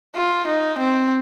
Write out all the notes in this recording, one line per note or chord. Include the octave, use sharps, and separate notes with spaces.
F4
D#4
C4